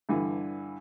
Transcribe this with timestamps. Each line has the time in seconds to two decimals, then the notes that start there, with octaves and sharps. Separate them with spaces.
0.09 G2 D3 E3